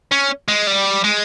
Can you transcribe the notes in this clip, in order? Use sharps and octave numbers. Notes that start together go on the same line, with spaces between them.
C#4
G#3
G3
G#3